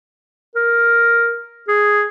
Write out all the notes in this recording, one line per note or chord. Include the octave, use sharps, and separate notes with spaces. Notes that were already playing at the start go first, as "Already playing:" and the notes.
A#4
G#4